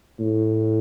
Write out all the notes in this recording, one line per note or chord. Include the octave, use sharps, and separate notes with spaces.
A2